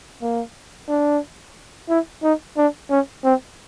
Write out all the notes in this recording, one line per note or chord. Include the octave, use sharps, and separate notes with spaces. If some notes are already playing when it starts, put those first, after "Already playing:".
A#3
D4
E4
D#4
D4
C#4
C4